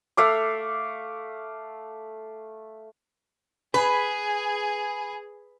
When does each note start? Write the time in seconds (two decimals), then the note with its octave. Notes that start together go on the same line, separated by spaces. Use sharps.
0.17 A3 F5 D6
3.74 G#4 B4 G#5 B5